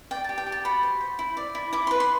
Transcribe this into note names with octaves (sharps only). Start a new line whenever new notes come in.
D5 G5
G4 A5
G5
G4
A5
F#4 B5
C5
C5
E4
D5
E4
E4 D6
B4 C6
C6